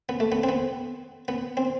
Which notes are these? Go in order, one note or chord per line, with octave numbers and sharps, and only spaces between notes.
B3
A3
B3
C4
B3
B3
C4